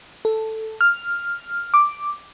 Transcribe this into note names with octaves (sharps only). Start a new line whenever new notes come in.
A4
F6
D6